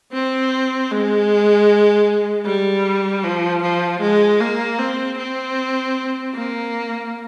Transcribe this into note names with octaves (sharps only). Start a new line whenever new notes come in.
C4
G#3
G3
F3
F3
G#3
A#3
C4
C4
A#3